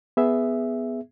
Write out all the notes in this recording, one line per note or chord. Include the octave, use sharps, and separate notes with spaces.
B3 G#4 E5